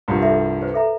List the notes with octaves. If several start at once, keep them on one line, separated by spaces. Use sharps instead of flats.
C2 G2 F3
A4 E5
B4 C5
A4 E5 A#5